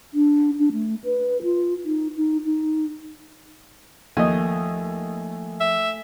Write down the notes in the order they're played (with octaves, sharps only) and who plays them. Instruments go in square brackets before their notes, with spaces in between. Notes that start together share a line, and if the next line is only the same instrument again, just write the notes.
[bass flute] D4
D4
A3
B4
F4
D#4
D#4
D#4
[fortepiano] D#2 D#5 [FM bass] F3 [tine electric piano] A3 G#5
[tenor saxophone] E5